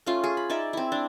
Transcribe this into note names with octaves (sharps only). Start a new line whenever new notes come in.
A3 C#4 F4
G#4
B5
D#4 D5 E5
C4 E4
D4